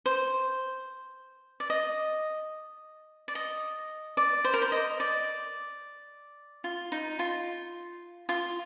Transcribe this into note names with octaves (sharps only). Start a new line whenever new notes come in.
C5
D5
D#5
D5
D#5
D5
C5
A#4
C5
D#5
D5
F4
D#4
F4
F4